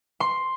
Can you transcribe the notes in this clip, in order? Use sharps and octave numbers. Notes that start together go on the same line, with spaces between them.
C6